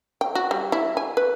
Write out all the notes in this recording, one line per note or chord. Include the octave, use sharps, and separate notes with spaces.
G5
F#4
G3
E4
G#5
B4